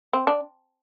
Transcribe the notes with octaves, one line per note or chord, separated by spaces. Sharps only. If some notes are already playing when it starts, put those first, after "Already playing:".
C4
D4